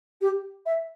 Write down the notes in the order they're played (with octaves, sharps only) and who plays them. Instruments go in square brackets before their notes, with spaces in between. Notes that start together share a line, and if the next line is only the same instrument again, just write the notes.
[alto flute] G4
E5